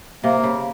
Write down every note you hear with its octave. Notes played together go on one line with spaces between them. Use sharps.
C3 A#3
C#3